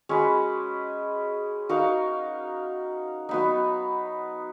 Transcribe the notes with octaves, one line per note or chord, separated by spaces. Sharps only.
G#3 C#4 F#4 B4
D#4 F#4 A#4 F5
F#3 B3 D#4